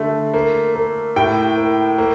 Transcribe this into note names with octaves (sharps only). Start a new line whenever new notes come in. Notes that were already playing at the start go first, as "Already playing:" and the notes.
Already playing: D3 A3
A#3
A#3
A2 G5
A#3
A#3